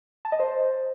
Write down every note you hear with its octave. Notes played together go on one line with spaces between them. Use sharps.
A5
D#5
C5